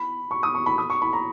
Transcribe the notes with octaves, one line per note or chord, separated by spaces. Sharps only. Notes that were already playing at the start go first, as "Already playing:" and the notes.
Already playing: B5
C#6
D#6
C#6
B5
D#6
C#6
B5
A#5